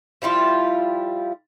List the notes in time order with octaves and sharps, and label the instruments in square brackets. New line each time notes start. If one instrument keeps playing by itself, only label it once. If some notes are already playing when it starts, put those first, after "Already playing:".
[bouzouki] F3 G3 E4 F4